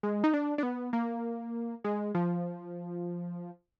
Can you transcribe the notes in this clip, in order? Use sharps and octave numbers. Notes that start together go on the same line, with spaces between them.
G#3
D#4
D4
D4
B3
A#3
G#3
F3